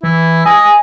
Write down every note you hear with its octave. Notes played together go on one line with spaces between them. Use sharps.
E3 E4
D#5 G#5